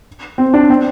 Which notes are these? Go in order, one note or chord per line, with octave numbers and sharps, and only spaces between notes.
C4
D4
C4